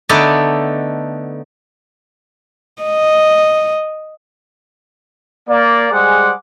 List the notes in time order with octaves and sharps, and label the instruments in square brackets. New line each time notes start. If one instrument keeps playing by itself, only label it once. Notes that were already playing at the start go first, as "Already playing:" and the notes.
[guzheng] D3 A3 B3 D#4 B4 D5
[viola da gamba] D#5
[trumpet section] A#3 D5
G3 G#3 G#4 C5 F#5 D6